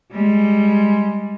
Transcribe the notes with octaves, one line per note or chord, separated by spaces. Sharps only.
G3 G#3